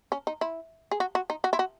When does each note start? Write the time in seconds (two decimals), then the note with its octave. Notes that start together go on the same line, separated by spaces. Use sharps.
0.12 C#4
0.27 D#4
0.41 E4
0.91 G#4
1.00 F#4
1.15 F#4
1.30 D#4
1.44 F#4
1.53 E4
1.59 F#4